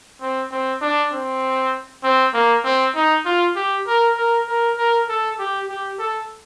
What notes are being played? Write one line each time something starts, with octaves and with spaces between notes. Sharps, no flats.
C4
C4
D4
C4
C4
A#3
C4
D#4
F4
G4
A#4
A#4
A#4
A#4
A4
G4
G4
A4